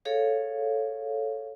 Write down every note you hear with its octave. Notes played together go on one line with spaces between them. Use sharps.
G#4 A4 C#5 F5